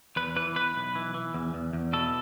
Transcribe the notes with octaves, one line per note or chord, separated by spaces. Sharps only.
E2 B4
E3 B4
E2 B4
B1
E3
E3
E2
E2
E2
B2 A4